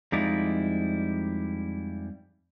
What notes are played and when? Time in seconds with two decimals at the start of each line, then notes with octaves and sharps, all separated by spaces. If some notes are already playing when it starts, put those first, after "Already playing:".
0.12 F2 G3 G#3 D#4 E4 D5